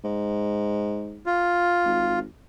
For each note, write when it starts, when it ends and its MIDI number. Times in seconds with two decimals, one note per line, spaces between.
0.04 1.24 44
1.26 2.19 65
1.85 2.24 32